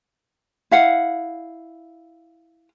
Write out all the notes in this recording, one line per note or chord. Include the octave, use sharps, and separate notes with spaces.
E4 F5 F#5